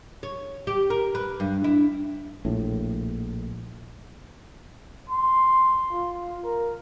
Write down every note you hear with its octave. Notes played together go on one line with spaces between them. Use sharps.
C#5
G4
A#4
B4
G2
E4
A#1 A2
C6
F4
A#4